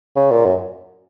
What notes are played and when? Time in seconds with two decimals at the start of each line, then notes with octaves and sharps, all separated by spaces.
0.16 C#3
0.31 A#2
0.45 F#2